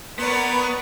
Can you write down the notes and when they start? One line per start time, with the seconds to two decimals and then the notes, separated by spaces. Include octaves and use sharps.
0.19 B3 A#4 B4 C#5 D5 A#5